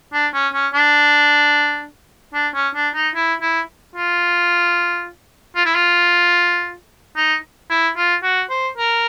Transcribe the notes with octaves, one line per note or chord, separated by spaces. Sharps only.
D4
C#4
C#4
D4
D4
C#4
D4
D#4
E4
E4
F4
F4
E4
F4
D#4
E4
F4
F#4
C5
A#4